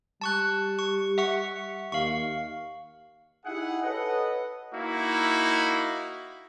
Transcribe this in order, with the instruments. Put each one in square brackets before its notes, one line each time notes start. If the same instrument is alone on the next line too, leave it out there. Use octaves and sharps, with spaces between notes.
[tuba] G3 [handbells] A5 C#6 F#6
[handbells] C#6
E5 F#5 C#6
[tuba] D#2 [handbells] F5 C#6
[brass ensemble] D#4 E4 G4 G#4 E5 F#5
A4 B4 C#5 D#5 F#5
[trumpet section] A#3 D#4 E4 F#4